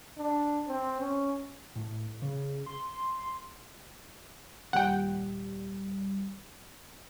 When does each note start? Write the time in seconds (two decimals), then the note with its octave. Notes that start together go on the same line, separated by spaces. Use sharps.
0.18 D4
0.67 C4
1.00 C#4
1.75 A2
2.22 C#3
2.66 C6
4.73 D#2 A#2 G3 F#5 G5